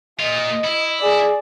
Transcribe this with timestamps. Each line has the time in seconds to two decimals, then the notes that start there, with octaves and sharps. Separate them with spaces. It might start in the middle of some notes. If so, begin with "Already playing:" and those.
0.19 A#2 F4 D#5
0.64 E4
1.00 G#4 D5